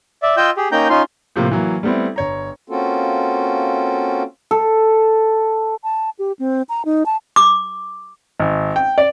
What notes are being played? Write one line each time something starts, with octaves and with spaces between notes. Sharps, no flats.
D5 E5
F4 D#5 G5 E6 G6
G4 G#4
A#3 C#4 D#4 G5 A#5 G6
C#4 D#4 F4 C6
A2 C3 F3 A#3 C4
E3 F#3 A#3
G3 A3 B3 C4 E4
G1 C#5 A#5
A#3 C4 C#4 F4 F#4 A4
A4
A5
G4
C4
A#5
D#4
A5
D6
G#1
G5
D5